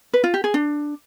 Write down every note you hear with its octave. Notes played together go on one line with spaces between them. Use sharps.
B4
F4
G4
G#4
D4